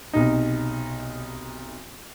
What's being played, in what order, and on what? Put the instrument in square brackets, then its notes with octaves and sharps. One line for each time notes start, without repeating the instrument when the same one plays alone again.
[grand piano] B1 C3 D#4